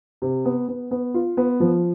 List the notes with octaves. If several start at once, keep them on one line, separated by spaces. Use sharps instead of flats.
C3
B3
B3
B3
F4
B3
F3